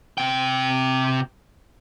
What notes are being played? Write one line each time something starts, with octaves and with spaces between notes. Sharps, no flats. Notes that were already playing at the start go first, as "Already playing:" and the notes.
C3 G5